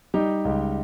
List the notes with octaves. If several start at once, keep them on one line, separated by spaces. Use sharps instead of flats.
G3 D#4 G4
C#2